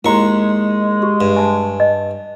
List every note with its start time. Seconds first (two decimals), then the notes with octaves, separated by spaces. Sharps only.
0.05 D#2 G#3 E4 A#5 C6 C#6
1.03 G4
1.21 G2
1.37 G#5 A5
1.80 D#5